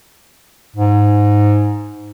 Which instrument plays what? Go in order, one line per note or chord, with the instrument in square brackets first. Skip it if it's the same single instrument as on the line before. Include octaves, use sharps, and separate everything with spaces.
[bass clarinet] G#2